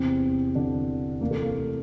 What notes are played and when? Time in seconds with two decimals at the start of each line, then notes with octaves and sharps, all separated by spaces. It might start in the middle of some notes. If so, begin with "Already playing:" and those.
Already playing: E2 C3 E3 C4
0.55 D3 D4
1.21 D2 C3 E3 A#3
1.31 A3
1.42 A#3